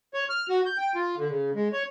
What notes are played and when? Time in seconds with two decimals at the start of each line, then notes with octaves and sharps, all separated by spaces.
0.14 C#5
0.30 F6
0.49 F#4
0.66 G6
0.78 G5
0.95 F4
1.17 D3
1.29 C#3
1.55 G#3
1.73 C#5